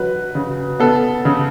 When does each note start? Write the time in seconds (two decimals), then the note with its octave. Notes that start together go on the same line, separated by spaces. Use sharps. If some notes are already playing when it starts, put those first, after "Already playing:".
Already playing: F#3 B4
0.35 C#3
0.80 B3 A4
1.25 C#3